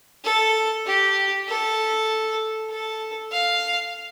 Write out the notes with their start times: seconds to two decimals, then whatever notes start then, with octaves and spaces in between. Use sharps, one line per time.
0.24 A4
0.86 G4
1.48 A4
2.70 A4
3.32 F5